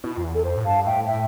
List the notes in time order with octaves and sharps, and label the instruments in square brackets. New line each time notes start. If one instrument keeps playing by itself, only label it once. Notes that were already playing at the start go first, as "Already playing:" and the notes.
[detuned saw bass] B2 [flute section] E4
[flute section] F4
[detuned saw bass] F2
E2
[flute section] A4
[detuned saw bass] F2 [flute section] C5
[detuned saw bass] A2
[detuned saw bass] G2 [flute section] F5 A5
[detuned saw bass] A2 [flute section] E5 G5
[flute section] E5 G5